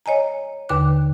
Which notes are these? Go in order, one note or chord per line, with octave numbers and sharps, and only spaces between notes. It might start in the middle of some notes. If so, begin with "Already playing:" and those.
C#5 D#5 G#5 A#5
D#2 D3 B4 D6 F#6